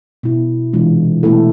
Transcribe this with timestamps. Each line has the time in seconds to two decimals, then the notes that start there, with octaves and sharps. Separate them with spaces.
0.23 B2 B3 E4
0.73 C3 E3 G#3 D4 F4
1.23 B2 A3 E4 A4